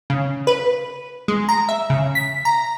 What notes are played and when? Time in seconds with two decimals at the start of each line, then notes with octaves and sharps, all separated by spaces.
0.10 C#3
0.47 B4
1.28 G#3
1.49 A#5
1.69 E5
1.90 C#3
2.15 B6
2.45 A#5